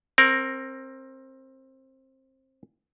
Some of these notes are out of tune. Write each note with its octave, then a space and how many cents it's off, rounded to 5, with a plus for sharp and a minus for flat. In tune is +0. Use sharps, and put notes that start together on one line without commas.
C4 +20 A#4 +0